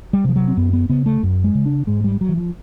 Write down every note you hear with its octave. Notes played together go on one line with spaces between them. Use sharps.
G3
C3 F3
F#3
C4
F#2 B3
B3
C#3 B3
A3
F#2
G#3
C#3
D4
G#2 G#3
G3
F#3
E3
F3